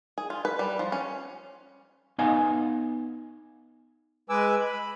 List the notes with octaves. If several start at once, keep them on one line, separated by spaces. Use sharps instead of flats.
G#4
F4
B4
G3
F3
C#4
B3 D#4 D#5 F5 G#5
G#3 B4 G#5 D6 E6
B5